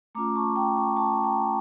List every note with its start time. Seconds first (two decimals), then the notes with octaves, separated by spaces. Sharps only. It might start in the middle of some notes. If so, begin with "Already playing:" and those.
0.15 A3 C#4 F4 A#5 D6
0.35 A5 C#6
0.56 G5 A#5
0.77 A5 C#6
0.97 A5 C#6
1.24 G5 A#5